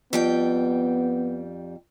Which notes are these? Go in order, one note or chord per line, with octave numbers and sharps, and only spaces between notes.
F2 G3 B3 G5